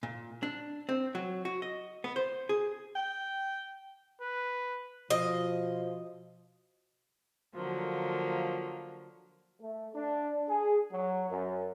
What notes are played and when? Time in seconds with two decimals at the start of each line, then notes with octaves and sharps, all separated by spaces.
0.03 A#2
0.43 D4
0.89 C4
1.15 F#3
1.45 F#4
1.62 D#5
2.04 B3
2.16 C5
2.49 G#4
2.96 G5
4.21 B4
5.10 B2 F3 D#5
7.54 D3 F3 F#3 A#3
9.60 A3
9.93 D4
10.49 G#4
10.91 F#3
11.30 F#2